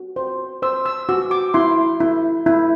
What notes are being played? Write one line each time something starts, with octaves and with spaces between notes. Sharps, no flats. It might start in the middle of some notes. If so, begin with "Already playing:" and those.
Already playing: F#4
C5
C5 E6
E6
F#4 E6
D6
E4 C6
E4
E4